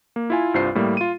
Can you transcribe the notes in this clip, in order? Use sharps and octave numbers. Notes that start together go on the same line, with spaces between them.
A#3
E4 F4 G#5
C2 G2 F4 C5 C7
A2 G3 A#3
F4 D#7